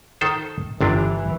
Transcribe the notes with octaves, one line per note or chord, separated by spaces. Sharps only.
D#3 A4 C5
G1 C3 E3 D4